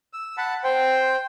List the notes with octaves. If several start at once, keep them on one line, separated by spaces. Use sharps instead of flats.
E6
F#5 A5 B5
C5 G5